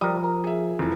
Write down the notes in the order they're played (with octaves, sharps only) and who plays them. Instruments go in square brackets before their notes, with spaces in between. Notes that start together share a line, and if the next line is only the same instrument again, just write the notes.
[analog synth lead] F3 [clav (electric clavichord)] G3 A#4 [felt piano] D#6
[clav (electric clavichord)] A#4
[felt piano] G#4 E5
F1 E3